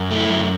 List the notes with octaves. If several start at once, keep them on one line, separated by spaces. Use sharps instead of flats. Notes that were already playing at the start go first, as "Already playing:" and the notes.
Already playing: F#2
A3
E4
F#2